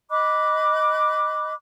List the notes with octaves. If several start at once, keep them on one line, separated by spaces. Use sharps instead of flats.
D#5 B5 D6 F#6